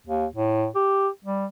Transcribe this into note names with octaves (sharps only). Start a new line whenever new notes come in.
D#2
A2
G4
G3